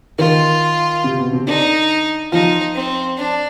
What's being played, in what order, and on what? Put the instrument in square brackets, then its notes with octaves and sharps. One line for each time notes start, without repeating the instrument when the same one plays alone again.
[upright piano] D#3 D#4 [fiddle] F4
[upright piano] C3 C4
B2 B3
C3 C4
[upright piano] D3 D4 [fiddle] D#4
[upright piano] F3 F4 [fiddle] D#4
[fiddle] C4
D4